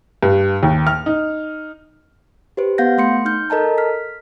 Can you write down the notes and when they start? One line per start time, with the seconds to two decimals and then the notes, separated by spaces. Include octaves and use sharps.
0.23 G2
0.63 D#2
0.87 F6
1.06 D#4
2.57 G4 B4 C5
2.78 B3 F5 F#5 G6 A#6
2.98 A3 C6 C#7
3.25 D#4 F6 G6
3.50 A4 A#4 D#5 A5 A#5
3.78 F6 B6